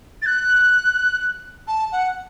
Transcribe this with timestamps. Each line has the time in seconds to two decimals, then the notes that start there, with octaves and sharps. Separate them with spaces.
0.22 A6
0.26 F#6
1.67 A5
1.92 F#5